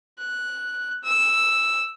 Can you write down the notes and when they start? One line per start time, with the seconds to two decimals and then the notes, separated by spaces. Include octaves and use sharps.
0.19 F#6
1.04 E6